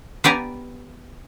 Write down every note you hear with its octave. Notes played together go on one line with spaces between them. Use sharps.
B3 G4 D5 G#5 A#5